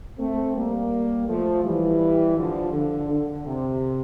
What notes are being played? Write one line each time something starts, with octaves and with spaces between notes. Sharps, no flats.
A3 C4
G3 A#3
F3 A3
E3 G3
D3 F3
D3
D3
C3